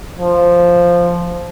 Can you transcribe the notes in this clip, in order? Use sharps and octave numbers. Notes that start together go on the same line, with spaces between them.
F3